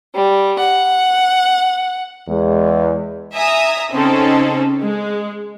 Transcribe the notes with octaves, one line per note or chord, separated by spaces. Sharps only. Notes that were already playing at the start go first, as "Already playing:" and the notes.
G3
F#5
E2 G#3
E5 G#5 A#5 D#6
C#3 C4 C#4 D#4 G#4 A4
G#3